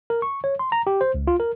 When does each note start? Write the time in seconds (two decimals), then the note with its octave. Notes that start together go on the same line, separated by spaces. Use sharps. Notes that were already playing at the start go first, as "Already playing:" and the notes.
0.10 A#4
0.22 C#6
0.44 C#5
0.59 C6
0.72 A#5
0.87 G4
1.01 C5
1.14 C#2
1.27 F4
1.40 A#4